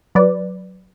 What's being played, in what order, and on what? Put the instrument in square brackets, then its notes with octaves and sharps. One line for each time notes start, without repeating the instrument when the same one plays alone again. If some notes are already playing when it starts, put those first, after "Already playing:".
[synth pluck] F#3 B4 D5